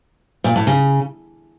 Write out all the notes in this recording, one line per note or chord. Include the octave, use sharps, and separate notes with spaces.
A#2
A2
C#3